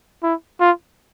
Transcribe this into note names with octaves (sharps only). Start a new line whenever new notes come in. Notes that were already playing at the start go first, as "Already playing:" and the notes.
E4
F4